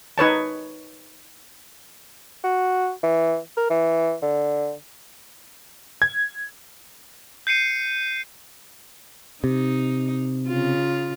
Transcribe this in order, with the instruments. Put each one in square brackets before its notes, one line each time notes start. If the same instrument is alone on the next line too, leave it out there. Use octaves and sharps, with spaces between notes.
[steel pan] D#4 B4 C#5 A5
[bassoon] F#4
E3
A#4
E3
D3
[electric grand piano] G#6
[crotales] G6 C7 C#7 D#7
[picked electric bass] C3 [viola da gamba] D#4
[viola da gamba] C#3 F4